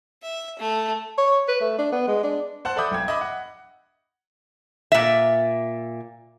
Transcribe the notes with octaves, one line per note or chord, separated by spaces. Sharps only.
E5
A3
C#5
B4
A3
D4
B3
G#3
D4
C5 F#5 A5 F#6
A4 D5 E5 B5 D#6 G6
B1 G5 G#6
D#5 E5 B5 D6
F#5
A#2 E5